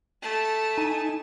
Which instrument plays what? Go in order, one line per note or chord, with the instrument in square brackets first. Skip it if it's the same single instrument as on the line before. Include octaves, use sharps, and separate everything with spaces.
[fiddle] A3 A5
[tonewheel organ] D#4 G#5